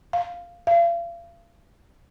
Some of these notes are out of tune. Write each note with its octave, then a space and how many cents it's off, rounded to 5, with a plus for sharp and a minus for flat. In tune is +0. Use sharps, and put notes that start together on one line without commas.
F5 -5
F5 -40